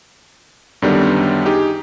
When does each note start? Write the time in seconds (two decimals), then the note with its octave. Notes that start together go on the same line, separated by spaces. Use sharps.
0.82 F#2 D3 D#3 G3 B3 D4
1.45 D#4 G4 G#4